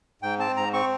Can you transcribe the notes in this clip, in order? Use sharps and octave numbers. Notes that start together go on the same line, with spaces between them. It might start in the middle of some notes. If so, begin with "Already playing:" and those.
G#2 G5
C4 A5
G#2 A#5
C4 C#6